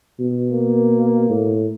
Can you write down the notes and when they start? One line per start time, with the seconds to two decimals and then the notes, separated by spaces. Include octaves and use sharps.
0.19 B2
0.52 A#3
1.29 A2